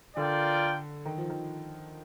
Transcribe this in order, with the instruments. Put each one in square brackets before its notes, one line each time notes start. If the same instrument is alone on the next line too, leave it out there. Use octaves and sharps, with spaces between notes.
[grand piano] D3 [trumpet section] F4 A#4 D5 G5
[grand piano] D#3
F3
D#3